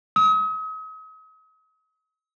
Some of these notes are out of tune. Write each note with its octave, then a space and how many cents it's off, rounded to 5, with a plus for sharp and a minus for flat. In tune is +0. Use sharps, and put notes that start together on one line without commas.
D#6 +40